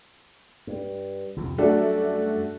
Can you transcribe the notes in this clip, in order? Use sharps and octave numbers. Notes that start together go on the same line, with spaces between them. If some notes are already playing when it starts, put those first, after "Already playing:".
G2
C2 F2 C3
F#2 G3 A3 D4 F#4